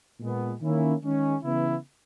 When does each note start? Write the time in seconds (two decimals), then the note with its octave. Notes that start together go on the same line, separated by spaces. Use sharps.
0.20 A#2 G#3 B3
0.62 D#3 A#3 C#4 E4
1.03 D#3 G#3 C#4
1.44 C#3 E3 B3 E4